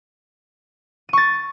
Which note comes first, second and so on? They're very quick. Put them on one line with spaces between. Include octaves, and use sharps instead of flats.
D#7 C#6 A6